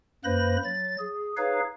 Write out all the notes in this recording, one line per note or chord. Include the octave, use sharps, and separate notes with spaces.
F#2 A#3 B4 C5 B5 A#6
F#3 A6
G#4
D#4 G#4 B4 C#5 F5